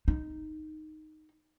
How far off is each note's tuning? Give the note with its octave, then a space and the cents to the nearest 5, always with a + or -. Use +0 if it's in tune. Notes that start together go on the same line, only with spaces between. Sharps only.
D#4 -5